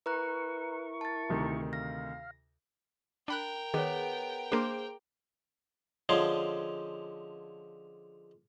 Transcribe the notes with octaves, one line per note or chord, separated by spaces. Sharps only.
E4 A#4 B4 A#5 C#6 F#6
A5 A6
D2 C3 D#3
F5 A#6
D4 A#4 G5 B5 F#6
D#3 B3 G#4 C#5
A#3 D4 G#4 C5
D3 F3 G#3 C#4 C6